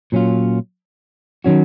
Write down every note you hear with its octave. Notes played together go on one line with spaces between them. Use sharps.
A#2 F#3 C#4 F4
D#3 F#3 C#4 F#4